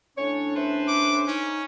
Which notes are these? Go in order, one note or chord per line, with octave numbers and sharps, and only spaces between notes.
A2 C#4 D4 C#5
B4 C5 E5
D6
C#4 D#4